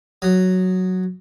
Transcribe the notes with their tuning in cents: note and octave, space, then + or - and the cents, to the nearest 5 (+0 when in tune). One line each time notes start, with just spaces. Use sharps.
F#3 +0 D#6 +0